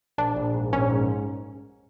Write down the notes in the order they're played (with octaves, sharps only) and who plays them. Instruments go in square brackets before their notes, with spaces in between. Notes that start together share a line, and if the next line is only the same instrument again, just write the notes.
[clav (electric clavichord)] A#1 [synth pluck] D4
[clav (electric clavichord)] A#1
G#2
[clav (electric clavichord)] A#1 [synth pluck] C#4
[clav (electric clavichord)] G#2